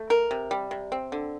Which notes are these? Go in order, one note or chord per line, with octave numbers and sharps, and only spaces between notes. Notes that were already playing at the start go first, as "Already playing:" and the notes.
Already playing: A3
A#4
C3
G3
C3
C4
D3